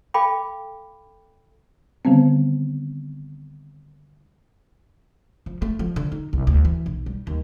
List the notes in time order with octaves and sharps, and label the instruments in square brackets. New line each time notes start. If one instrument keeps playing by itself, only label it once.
[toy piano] A4 F5 G5 B5 D6
[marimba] D3 D#3 G3 B3 C4
[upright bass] F3
A3
F3
D3
D#4
C2
D2
E3
B1
G3
D#2